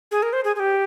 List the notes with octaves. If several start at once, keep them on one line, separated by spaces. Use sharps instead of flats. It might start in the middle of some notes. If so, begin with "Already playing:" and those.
G#4
A#4
C5
G#4
G#4
G4